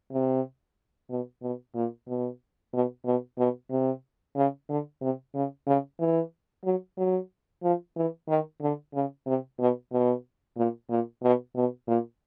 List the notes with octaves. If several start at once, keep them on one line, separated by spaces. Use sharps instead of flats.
C3
B2
B2
A#2
B2
B2
B2
B2
C3
C#3
D3
C3
C#3
C#3
E3
F#3
F#3
F3
E3
D#3
D3
C#3
C3
B2
B2
A#2
A#2
B2
B2
A#2